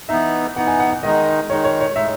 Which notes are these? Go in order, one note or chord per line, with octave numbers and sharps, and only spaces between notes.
E3 B3 D#4 E5
E3 B3 D#4 F#5
G#5
F#5
F#5
D#3 G#3 D#4 D#5
D#3 G#3 D#4 C#5
C#5
C#5
A2 G#3 D#4 E5